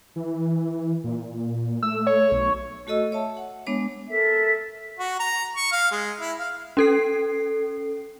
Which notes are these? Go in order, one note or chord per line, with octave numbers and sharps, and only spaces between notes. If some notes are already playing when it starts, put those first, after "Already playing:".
E3
A#2
A3 E6
C#5
B1
A3 F#4 A4 D#5 E6
C#5 E5 A5
F#5
G#3 B3 D4 C#5 D6
A4 A#4 E5
F#4
A#5
C#6
F5
G#3
E4
F5
C#4 A4 C7